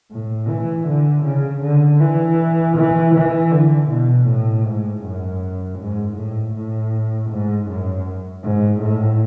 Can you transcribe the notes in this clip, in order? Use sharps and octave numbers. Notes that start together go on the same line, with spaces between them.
A2
E3
D3
C#3
D3
E3
E3
E3
D3
B2
A2
G#2
F#2
G#2
A2
A2
G#2
F#2
G#2
A2